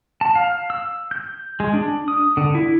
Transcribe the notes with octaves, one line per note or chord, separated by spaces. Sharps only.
A5
F5
E6
G6
G#3
D4
D#6
D3
E4